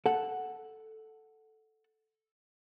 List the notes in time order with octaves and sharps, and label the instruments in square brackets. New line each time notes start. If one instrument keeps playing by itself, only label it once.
[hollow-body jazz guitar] A4 F#5